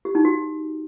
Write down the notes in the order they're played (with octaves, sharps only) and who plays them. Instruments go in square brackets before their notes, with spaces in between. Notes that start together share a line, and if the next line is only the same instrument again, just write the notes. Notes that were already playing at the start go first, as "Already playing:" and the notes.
[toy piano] G4
D#4
F#4